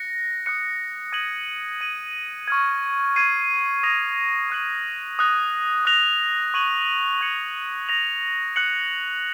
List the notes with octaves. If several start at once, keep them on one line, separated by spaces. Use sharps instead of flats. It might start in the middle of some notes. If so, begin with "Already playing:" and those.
Already playing: F#6 A#6 C#7
D#6 F#6 C#7
D#6 G#6 D#7 F#7
G#6 D#7 F#7
C#6 F6 G#6
G#6 C7 D#7
D#6 A#6 F7
C#6 F#6 C7 F#7
D#6 F#6 A#6
D#6 F#6 A#6 F7
C#6 G#6 D#7 F#7
C#6 G#6 C#7 F#7
D#6 A#6 F7
F#6 C#7 F#7